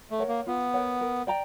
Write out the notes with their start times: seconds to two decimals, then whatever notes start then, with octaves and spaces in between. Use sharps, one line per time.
0.11 A3
0.19 A#4 C#5 F#5
0.28 A#3
0.46 B3 F4
0.74 A#4 C#5 F#5
1.01 A#4
1.27 D5 G5 A#5